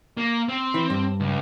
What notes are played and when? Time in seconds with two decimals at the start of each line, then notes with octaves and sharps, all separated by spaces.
0.17 A#3
0.49 C4
0.74 E3
0.90 G2
1.20 C#2